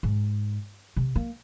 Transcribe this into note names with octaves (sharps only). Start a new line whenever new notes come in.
G#2
C3
A#3